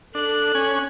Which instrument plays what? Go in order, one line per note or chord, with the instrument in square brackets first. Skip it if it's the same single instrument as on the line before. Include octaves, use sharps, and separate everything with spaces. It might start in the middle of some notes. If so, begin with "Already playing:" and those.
[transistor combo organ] D4 [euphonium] A4 [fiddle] F#6
[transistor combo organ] C#4 G#5